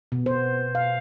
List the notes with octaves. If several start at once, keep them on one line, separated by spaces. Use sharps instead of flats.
B2
C5
F5